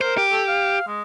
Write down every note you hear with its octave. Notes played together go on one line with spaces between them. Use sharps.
A#4 C5
G4
A4
F5
G#3